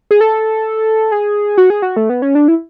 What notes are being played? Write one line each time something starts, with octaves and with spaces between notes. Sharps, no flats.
G#4
A4
G#4
F#4
G#4
F#4
A3
B3
C#4
D4
E4